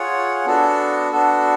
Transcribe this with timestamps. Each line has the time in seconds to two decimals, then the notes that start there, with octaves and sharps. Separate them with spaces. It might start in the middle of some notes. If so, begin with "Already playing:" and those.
Already playing: F4 G#4 C#5 F#5
0.45 B3 D4 F#4 A4
1.11 B3 D4 F#4 A4